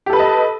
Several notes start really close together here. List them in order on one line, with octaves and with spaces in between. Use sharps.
G4 A4 B4 A5 D#5